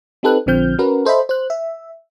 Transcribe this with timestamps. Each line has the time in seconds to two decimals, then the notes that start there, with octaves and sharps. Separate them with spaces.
0.23 C4 D#4 G4 A4 B4 F#6
0.46 A#1 D3 F3 C4 F6 G6
0.78 C#4 F#4 A#4 B4
1.05 A4 C5 D#5 E5 B5
1.29 C5 F#6
1.50 E5